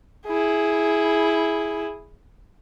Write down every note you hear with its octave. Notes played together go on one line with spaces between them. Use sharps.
E4 G#4